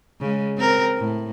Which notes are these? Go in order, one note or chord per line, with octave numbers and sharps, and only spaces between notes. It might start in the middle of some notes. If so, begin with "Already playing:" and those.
C#3 G#3
C4 A#4
A2